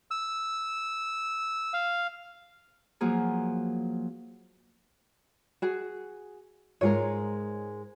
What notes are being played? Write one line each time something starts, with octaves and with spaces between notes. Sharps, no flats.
E6
F5
F3 F#3 A#3 G#4
F#4 G#4
G#2 G#3 F4 A#4 C#5